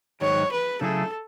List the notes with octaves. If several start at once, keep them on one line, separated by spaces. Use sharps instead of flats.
G#2 D#3 F#3 C#5
B4
C#3 F#3 A3 E4 G#4 A4